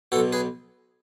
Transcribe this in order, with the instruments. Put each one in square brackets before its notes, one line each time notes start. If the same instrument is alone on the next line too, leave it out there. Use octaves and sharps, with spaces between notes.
[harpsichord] B2 F#4 A4
B1
G#4 B4